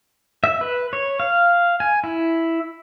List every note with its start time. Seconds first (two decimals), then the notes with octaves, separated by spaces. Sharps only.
0.44 E5
0.61 B4
0.93 C#5
1.20 F5
1.80 G#5
2.04 E4